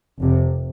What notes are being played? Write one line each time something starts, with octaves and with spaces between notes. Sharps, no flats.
F1 F2 C3